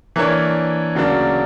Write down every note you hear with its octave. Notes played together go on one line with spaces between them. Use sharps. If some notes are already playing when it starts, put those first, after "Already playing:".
E3 A#3 D4 A#4 C#5
D2 C#3 F#3 A#3 D4